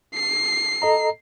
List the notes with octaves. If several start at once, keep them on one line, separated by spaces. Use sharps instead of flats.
C7
A4 D#5 A#5